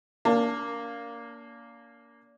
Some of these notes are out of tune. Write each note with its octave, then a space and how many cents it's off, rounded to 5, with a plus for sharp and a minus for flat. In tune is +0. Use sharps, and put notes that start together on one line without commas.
A#3 +0 D4 -40 A5 +35